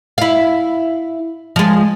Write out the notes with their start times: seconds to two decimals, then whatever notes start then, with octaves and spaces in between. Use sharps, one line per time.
0.18 E4 F5
1.56 F3 G#3